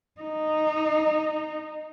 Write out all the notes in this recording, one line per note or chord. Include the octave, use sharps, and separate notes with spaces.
D#4